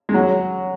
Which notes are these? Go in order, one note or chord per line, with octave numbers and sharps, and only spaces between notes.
G#3
F#3